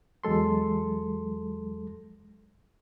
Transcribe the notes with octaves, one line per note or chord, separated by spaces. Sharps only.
E2 F#3 G#3 A4 C6